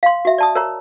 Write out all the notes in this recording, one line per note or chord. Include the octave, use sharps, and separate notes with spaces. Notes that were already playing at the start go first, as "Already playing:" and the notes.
F5 C6
F#4 E5
D5 A5 D#6
A#4 C#5 A#5